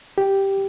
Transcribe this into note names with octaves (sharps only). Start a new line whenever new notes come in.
G4